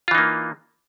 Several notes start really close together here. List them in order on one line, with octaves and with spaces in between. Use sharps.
F4 E3 D#4 A#3